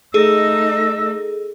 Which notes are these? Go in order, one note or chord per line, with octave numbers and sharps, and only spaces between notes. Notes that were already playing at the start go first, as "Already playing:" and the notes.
A3 D#4 G#4 A4 D#5 E6